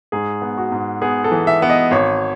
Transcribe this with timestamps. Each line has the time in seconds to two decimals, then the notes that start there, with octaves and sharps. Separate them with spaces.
0.12 G#2 G#4
0.42 B3
0.58 F#4
0.72 G#2
1.02 B3 G#4
1.24 A4
1.31 E3
1.47 E5
1.62 B3
1.70 D#5
1.91 G#1 C#5